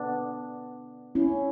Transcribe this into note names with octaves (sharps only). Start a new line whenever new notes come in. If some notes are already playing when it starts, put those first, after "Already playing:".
Already playing: B3 D4
C#4 E4